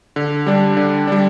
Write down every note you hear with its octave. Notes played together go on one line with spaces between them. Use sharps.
D3
G3 D4
D3
G3 D4